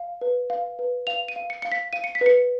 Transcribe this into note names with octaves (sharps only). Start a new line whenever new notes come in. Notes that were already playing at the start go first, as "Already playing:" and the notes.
Already playing: F5
B4
F5
B4
F5 F7
D#7
F5
C#7
F5 C#7
B6
F5 D#7
C#7
B6
B4 C#7